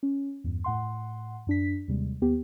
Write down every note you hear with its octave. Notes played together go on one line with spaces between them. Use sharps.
C#4
E2 G2
A2 F#5 C6
F#2 D4 B6
D#2 C3 G3 G#3
D#2 B3 G4